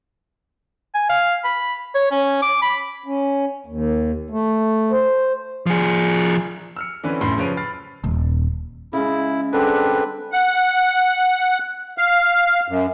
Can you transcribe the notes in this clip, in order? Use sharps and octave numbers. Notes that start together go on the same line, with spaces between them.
G#5
F5
B5
C#5
C#4
D6
B5
C#4
D#2
A3
C5
F3 G#4
E6 F6 C#7
D3 E3 C4 C#4 B4
F1 F#2 A2 B5 C6 C7
C#3 F3 B4 C#5 D7 D#7
B5 F6 A6 C7
D#1
C#3 G#3 E4
D3 G3 G#3 C4 D4 B4
F#5
F5
F#2